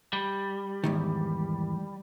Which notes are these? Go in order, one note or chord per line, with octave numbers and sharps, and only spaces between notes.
G3
E2 G#2 D#3